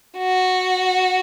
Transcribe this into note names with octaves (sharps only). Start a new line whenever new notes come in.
F#4